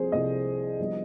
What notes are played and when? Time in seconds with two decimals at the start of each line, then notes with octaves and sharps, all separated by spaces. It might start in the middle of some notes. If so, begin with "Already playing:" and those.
Already playing: C2 C3 F3 G#4 C5
0.12 C2 C3 F3 D#5
0.78 G1 G2 F3